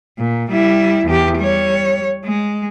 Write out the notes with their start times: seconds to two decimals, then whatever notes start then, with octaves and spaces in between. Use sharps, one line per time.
0.18 A#2
0.50 G3 E4
1.06 E2 G4
1.38 G3 C#5
2.25 G#3